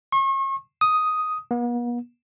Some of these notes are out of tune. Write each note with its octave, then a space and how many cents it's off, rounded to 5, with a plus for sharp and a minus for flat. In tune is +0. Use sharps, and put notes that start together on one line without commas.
C#6 -40
D#6 +5
B3 -45